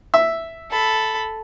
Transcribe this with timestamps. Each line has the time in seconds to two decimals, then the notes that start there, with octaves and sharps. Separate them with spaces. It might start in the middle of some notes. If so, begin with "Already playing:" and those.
0.14 E5
0.70 A4 B5